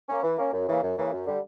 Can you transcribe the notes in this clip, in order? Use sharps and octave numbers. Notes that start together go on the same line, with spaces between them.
A#3 C#4
E3
A#3 C#4
F#2
C#3 E3 A#3
F#2
C#3 E3 A#3
F#2
D3 G3